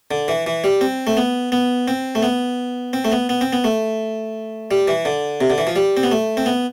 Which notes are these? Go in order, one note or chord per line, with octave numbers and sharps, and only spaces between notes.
D3
E3
E3
G3
C4
A3
B3
B3
C4
A3
B3
C4
A3
B3
B3
C4
B3
A3
G3
E3
D3
C3
D3
E3
F3
G3
C4
B3
A3
C4
B3